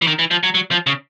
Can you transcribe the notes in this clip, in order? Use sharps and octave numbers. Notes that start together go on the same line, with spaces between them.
E3
D#3
E3
F3
F#3
F#3
F3
C#3